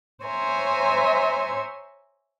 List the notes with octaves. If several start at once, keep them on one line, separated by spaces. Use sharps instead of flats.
C5 C#5 E5 G#5 A#5